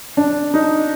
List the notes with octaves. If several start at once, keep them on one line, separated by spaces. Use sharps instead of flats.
D4
D#4